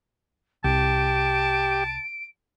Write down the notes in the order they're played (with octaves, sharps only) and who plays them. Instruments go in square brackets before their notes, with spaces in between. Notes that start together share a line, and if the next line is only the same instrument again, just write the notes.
[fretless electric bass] C2 [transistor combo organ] G4 [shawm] A5 [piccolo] D7